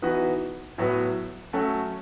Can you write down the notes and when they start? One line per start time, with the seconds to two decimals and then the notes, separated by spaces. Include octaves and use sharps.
0.02 E3 B3 D#4 F#4 B4
0.78 A2 F#3 B3 F#4 B4
1.53 F#3 A3 C#4 F#4 A4